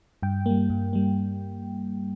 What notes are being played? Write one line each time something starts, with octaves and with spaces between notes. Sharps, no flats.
G2 G5
G3 A#3
G2
G3 A#3